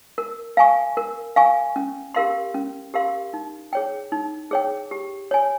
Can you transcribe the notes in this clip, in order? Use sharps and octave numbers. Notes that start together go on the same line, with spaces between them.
A#4
F5 G#5 C#6
A#4
F5 G#5 C#6
C#4
G4 A#4 F5 C6
C#4
G4 A#4 F5 C6
D#4
G#4 C#5 G5
D#4
G#4 C#5 G5
G4
C#5 G#5